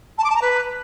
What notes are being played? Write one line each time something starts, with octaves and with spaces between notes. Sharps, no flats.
A5
D6
A5
A#5
B4